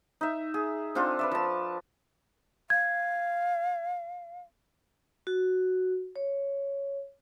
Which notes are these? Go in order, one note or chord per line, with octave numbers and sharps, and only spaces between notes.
D#4 E5
G#4
C4 D4 F4 A4
B4 D5 E5
F3 A5
F5 G#6
F#4
C#5